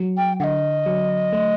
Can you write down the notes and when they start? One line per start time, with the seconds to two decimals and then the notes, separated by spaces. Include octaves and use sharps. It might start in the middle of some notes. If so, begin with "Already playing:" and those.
Already playing: F#3
0.17 G5
0.40 D3 D#5 F#5
0.86 F#3
1.32 A3